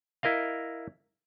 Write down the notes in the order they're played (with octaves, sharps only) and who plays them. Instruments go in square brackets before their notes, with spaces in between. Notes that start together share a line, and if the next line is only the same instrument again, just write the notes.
[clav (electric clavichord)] E4 A#4 D#5 F5